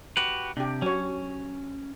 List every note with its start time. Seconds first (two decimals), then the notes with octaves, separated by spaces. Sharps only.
0.17 F#4 G4 B4
0.57 C3 D4 G4
0.82 F#3 C#4 C#5